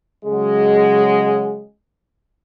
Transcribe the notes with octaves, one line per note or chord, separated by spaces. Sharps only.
C#3 F#3 G#3